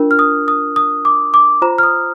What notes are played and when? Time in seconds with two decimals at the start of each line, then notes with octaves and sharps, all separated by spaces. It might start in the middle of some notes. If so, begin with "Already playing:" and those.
Already playing: D4 F4 A#4
0.11 F6
0.19 D#6
0.48 D#6
0.76 D#6
1.05 D6
1.34 D6
1.62 F4 C5 A#5
1.78 F6
1.83 D#6